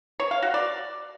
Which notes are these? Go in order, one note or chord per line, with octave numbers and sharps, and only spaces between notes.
C#5
F5
F#4
D5